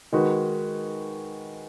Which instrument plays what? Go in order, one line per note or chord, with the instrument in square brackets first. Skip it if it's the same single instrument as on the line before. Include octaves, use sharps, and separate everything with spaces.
[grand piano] D#3 G#3 D#4 F#4 B4